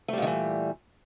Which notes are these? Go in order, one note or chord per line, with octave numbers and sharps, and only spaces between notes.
A#2 D#3 E3 G3 A3